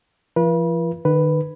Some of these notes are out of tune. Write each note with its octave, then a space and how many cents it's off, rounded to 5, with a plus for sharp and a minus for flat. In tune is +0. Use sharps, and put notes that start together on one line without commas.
F3 -45 F4 -45 B4 -35
D#3 -40 B4 +0